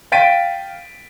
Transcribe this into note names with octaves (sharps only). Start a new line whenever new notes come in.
F5 G5 A6 B6 D7 D#7